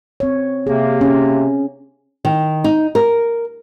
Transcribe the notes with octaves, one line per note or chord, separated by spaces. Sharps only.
C4 C#5
C3 A#3 G#4
C#4
D#3
D#4
A#4